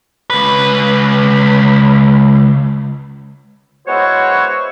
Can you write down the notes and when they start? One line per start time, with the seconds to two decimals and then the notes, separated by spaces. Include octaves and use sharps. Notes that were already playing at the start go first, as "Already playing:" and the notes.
0.30 C#2 B4
3.87 G#3 B3 E4 F#4 C5 C#5